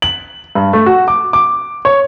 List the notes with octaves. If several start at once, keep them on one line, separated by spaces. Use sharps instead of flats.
F#7
G2
A3
F#4
D6
D6
C#5